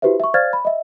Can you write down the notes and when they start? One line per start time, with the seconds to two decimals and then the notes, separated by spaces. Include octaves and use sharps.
0.02 E4 F#4 G4 B4 C5 E5
0.20 E5 C#6
0.34 C5 D5 F5 F6 G#6 A6
0.53 B5
0.65 D#5 E5